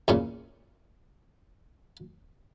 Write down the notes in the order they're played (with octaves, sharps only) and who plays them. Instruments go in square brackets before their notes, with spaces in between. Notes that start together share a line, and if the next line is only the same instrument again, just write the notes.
[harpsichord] E2 A#2 C#3